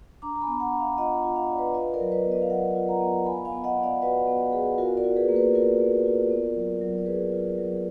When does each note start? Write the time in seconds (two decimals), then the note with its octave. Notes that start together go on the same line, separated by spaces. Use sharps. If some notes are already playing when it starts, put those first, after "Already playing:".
0.22 D4 A#5 D6
0.36 A#5
0.41 G#5 B5
0.47 B3
0.60 F#5 A#5
0.73 D4
0.80 F5 G#5
0.98 F4 D#5 F#5
1.24 F4
1.36 F5
1.43 D#5
1.50 F4 D5
1.59 B4 D#5
1.74 F4 B4 D#5
1.94 A#4 D5
2.00 F#3
2.12 B4 D#5
2.26 B3
2.32 B4 D#5
2.42 F5
2.50 F#3 D#5 F#5
2.75 F4
2.89 F#5 A#5
3.01 B3
3.26 B3 G#5 B5
3.45 F5 G#5
3.52 B3
3.64 D#5 F#5
3.78 B3
3.83 D5 F5
4.02 F#4 B4 D#5
4.27 B3
4.53 B3 G#4
4.78 F4 F#4 A#4
4.97 A#4 D5
5.04 F4
5.16 G#4 B4
5.29 A#3
5.35 G#4 B4
5.54 F4 A#4 D5
5.80 A#3
6.06 F4
6.31 B3
6.56 F#3
6.81 F#3
6.98 D5
7.06 F#3 G#4 B4
7.32 F4
7.58 F#3